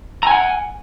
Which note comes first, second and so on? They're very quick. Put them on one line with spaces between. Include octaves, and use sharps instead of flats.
A#5 G#5 F#5